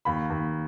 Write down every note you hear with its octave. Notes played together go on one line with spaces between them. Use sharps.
D#2 B5
D#2